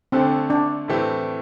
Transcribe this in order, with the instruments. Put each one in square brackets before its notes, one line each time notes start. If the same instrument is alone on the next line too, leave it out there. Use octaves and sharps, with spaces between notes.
[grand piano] D3 A3 D4 A4 [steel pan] C4
[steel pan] D4
[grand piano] A2 E3 A3 C4 G4